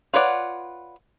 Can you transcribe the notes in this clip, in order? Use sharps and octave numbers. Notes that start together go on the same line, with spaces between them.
F4 B4 C#5 D5 F#5